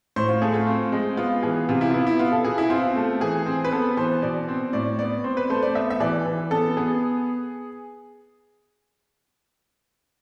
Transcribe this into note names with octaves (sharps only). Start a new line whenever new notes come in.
A2 C5
F4
A3 G#4
F4
C4
G#3
B3 F4
E3 G#4
C3 F4
E4
F4
B3 E4
E4
B3 F4
A4
B2 G#4
E4
C4 F4
A3
E3 G#4
C4
B4
B3 A4
E3 C5
B2 D5
C4
A2 D5
B3 D5
C4 C5
B4
A3 C5
D5
B3 E5
E5
E3 D5
E3
B3 A4
B3 G#4